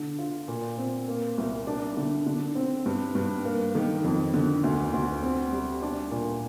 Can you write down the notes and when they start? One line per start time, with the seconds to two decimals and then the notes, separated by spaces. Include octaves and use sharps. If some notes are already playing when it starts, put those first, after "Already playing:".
Already playing: D3
0.19 F4
0.48 A#2
0.78 C4
1.08 A#3
1.38 C2
1.67 D4
1.97 D3
2.26 D3
2.55 C4
2.86 G2
3.15 G2
3.45 A#3
3.75 D#3
4.04 F2
4.34 D3
4.64 D2
4.93 D2
5.22 C4
5.52 G3
5.82 D4
6.11 A#2